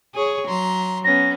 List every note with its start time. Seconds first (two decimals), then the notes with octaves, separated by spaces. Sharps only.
0.15 G#4 C#5
0.47 F#3 A#5 C6
1.05 B3 C#4 A#6